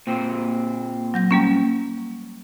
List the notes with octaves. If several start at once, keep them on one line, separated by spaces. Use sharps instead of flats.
A#2 C4
F#3 G6 A#6
G3 A#3 C#4